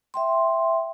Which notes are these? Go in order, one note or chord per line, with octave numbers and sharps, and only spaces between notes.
E5 G5 C6